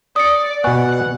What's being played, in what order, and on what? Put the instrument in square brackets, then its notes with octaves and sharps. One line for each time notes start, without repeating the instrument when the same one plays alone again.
[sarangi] D5 [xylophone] D#6 C#7
[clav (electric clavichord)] B2 B3 [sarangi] F#5 [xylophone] G#5 C#6 F#6